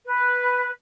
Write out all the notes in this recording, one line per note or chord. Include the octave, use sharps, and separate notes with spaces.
B4